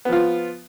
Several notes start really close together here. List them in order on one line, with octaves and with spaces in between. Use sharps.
B3 F3 F4